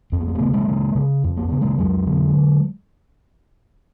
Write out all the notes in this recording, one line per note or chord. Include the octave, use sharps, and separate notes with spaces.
F2 C4
B3
A#3
C#3 A3 B3
G#3 A#3
C#3
C#3
F2
A#3
C#3 B3
G#3 A#3
F2 F#3 G#3
D3